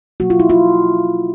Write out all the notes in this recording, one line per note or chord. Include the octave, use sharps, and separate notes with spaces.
B2 F#3 A#3 F#4
F4
E4
F4